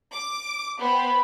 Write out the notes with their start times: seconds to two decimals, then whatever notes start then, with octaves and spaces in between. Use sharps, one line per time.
0.13 D6
0.80 B3 B4 C5 G5 B5